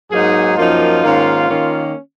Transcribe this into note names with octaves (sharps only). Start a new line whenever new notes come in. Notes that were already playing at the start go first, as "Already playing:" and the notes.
G#2 F#3 A#3 D#4 G#4
F#2 F3 A#3 D#4 F4
G#2 D#3 A#3 C#4
D#3 A#3 C#4